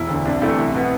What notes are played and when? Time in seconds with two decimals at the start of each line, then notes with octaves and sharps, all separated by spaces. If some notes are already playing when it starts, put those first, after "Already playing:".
Already playing: E1 E4
0.09 D2 D3
0.25 C2 D4
0.42 C3 E3 A3 E4
0.58 C2
0.75 B2 B3